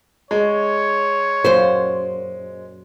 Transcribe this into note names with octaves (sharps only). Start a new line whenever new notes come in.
G#3 C#5
F#2 A#2 F#3 C5